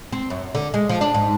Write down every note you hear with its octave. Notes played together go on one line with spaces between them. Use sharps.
C4
F#2
D3
G#3
F3
D4
G#2